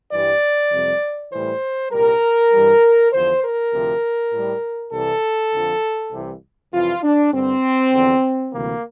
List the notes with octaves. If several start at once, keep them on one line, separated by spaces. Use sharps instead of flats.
G2 E3 G3 D5
F2 C3 G3
A2 E3 G3 C5
C2 A#2 G3 A#4
G2 E3 G3
E2 D3 F3 C5
A#4
D2 C3 F3
A2 G3
C2 C3 E3 G3 A4
F2 D3 F3
C2 C3 E3
F2 C3 E3 G3 F4
D4
G2 D3 G3 C4
E2 D3 F3
D2 C3 E3 G3 A#3